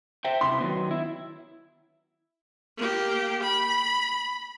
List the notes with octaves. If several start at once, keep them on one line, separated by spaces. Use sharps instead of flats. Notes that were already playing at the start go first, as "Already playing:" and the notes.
C5 E5 G5
C3 E4 C6
D#3 F#3 B3
E4
A#3 G4
B5